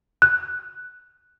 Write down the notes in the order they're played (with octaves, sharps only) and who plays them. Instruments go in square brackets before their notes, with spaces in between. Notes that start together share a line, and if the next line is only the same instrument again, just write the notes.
[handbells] F#6